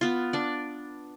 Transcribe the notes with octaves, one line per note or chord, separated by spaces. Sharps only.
B3 F4
D4 D5